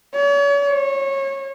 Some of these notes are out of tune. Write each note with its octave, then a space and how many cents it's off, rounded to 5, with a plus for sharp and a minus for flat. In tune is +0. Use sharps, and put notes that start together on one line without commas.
C#5 +40
C#5 -25